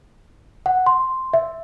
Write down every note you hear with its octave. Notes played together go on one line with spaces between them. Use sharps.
F#5
C6
E5